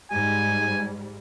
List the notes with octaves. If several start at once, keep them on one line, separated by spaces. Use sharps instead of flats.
G#2 G3 G#5